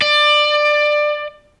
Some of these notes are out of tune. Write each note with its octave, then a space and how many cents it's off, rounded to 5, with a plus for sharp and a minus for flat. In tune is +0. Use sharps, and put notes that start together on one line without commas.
D5 +20